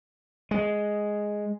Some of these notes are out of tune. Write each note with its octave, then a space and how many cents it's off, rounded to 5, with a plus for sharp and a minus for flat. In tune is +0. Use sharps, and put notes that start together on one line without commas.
G#3 +0